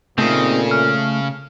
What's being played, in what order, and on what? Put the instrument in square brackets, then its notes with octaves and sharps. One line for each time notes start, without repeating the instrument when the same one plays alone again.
[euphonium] A#2 [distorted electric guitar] C#3 [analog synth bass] A3 [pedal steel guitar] C4 D#4 G#4
[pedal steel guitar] F6